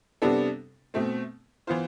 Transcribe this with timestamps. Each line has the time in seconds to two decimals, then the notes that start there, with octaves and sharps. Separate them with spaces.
0.22 C3 G3 B3 D4 A4
0.94 B2 A3 C4
1.67 E3 B3 F4 C5